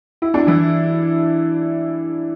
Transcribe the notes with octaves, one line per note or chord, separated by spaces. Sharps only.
E4
D4
E3 E4